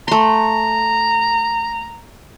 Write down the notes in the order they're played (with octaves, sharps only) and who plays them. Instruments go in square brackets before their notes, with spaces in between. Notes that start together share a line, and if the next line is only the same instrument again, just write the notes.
[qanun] A3 C6 [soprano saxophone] A#5